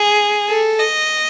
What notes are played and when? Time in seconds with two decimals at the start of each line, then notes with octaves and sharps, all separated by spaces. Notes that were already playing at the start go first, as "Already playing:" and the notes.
Already playing: G#4
0.49 A4
0.79 D#5